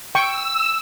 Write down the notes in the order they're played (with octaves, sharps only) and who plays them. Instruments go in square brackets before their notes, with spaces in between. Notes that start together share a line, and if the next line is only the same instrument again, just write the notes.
[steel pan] G5 C#6 [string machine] E6